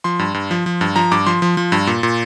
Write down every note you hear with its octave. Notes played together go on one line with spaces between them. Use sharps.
F3 C6
G2
G2
F3
F3
G2
F3 A#5
G2 D6
F3 C6
F3
F3
G2
A#2
A#2